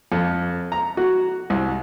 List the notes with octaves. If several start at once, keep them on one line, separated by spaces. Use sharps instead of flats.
F2
A#5
F#4
C2